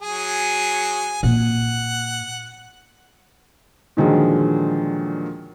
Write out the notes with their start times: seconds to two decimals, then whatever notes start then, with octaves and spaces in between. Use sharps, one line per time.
0.01 F#3 G#4 G#5
1.23 A#2 F#5
3.97 A#2 D3 D#3 F3 F#3 G#3